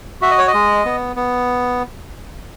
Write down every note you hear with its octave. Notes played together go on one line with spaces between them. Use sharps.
F#4 E5
D#5
C#5
D#5
G#3
B3
B3